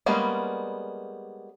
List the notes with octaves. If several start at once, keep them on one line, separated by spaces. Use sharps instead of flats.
G3 G#3 A#3 B3 C#4